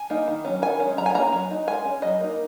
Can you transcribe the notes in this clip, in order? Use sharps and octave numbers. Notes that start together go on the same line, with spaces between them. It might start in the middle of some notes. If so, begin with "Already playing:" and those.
Already playing: G#5
A#3 D#4
D#3
F#3 C#4
D#3 G#5
G#3 C#4
F#3 A#5
G#5
A#3 C#4 A#5
F#3
D#4
G#3 G#5
C#4
F#3 D#5
A#3 D#4